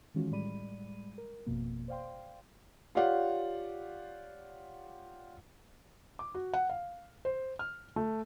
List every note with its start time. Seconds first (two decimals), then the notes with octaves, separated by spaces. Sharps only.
0.14 D#3 E3 G#3 C#4 F4 F#4
0.31 A2 G3 G#3 D5 B5 D#7
1.18 A#4
1.46 G#1 F2 B2 A#3
1.88 C5 D5 F5 G5 C6
2.95 F4 G4 C#5 D5 F5 F#5
6.19 D6
6.34 F#4
6.54 F#5
6.70 F5
7.25 C5
7.59 F6
7.96 A3